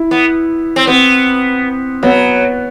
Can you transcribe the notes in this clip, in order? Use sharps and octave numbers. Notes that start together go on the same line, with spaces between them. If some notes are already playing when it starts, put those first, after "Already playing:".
Already playing: E4
B3
C4
B3 C4
F#3 B3